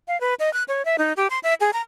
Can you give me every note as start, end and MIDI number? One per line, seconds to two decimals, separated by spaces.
0.08 0.19 77
0.21 0.34 71
0.40 0.52 75
0.53 0.63 90
0.68 0.85 73
0.85 0.96 76
0.98 1.13 63
1.17 1.27 67
1.30 1.39 84
1.43 1.54 76
1.60 1.71 68
1.73 1.81 82